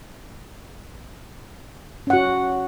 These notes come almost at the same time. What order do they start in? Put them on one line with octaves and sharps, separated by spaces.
C#4 F#5 F#4